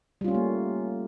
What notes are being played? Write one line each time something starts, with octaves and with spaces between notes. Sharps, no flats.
G3 A3 A#3 C#4 F4